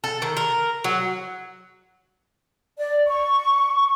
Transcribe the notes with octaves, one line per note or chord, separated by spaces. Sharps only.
A4
D#3
A#4
F#3
D5
C#6